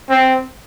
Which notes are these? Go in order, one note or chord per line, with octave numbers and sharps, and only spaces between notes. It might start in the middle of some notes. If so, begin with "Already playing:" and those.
C4